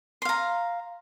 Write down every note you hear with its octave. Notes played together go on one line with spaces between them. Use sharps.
F5 A#5 C6